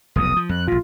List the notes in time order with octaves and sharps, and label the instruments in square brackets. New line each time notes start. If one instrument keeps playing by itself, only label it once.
[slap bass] F1 B1 E2 [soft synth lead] D#6
[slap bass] F3
[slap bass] F2 [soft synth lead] F#6
[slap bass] A#1 A2 [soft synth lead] F4